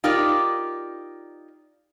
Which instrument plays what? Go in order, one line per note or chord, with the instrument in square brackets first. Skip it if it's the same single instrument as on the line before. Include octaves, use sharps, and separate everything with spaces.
[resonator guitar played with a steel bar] D#4 F4 G4 A#4 D5